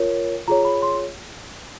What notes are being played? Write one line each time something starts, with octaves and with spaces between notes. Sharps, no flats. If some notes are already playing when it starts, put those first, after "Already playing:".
Already playing: F4 A#4 C#5
F4 G#4 C#5 A#5
B5
C6